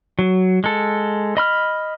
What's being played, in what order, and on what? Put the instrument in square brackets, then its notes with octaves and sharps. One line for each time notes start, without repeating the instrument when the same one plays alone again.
[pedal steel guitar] F#3
G#3 A4
D#5 B5 F6